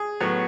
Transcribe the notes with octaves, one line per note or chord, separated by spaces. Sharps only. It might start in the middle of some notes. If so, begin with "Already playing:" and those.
Already playing: G#4
A2 F#3 B3